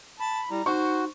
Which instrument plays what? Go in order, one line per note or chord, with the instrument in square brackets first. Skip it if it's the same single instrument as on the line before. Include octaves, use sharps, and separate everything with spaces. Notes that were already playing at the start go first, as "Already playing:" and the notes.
[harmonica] A5 [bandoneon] B5
[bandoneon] G3 [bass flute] E4 [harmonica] A#5
[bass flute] D#4 [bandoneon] F#4 [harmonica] C5 [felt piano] C#6